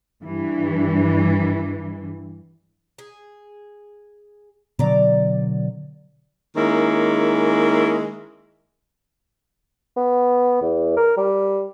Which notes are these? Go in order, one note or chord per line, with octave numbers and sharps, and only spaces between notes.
G2 E3
G#4
B2 D3 F#3 D5 A#5
D#3 G#3 A#3 C#4 E4
B3
E2
A#4
G3